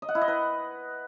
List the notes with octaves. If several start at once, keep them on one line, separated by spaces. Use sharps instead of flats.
D#5
F#5
E4
D#5
B4